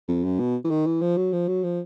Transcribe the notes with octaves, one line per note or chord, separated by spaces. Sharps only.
F2
F#2
B2
E3
D#3
E3
F3
F#3
F3
F#3
F3